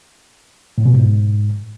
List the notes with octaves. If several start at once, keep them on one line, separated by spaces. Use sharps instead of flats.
A2
B2
G#2